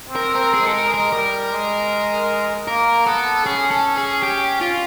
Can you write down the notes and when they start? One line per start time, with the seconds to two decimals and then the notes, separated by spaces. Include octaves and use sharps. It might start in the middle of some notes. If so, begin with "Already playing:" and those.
0.10 C4
0.16 A#4
0.35 C4 A#4
0.54 G#4
0.61 G#3
0.67 A4
0.74 A#4
0.87 G#3
0.94 A#4
1.12 G3 A#4
1.52 G#3
2.67 A#3 A#4
3.06 B3 A4
3.46 C#4 G#4
3.71 A4
3.97 G#4
4.23 G4
4.61 F4